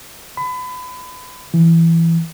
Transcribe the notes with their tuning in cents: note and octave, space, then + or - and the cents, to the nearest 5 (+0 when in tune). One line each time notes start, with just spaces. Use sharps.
B5 +30
E3 +10